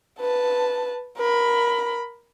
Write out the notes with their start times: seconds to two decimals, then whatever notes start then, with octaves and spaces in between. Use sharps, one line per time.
0.20 B4 A5
1.18 A#4 B5